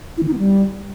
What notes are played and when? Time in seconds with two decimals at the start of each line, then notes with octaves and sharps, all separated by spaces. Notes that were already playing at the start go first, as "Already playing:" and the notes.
0.17 E4
0.23 D#3
0.28 D#4
0.33 B3
0.38 G3